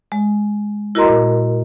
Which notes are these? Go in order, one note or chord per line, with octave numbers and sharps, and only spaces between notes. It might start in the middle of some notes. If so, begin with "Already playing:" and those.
G#3
E4 F#4 A#4 D#5 A#5 C6
A#2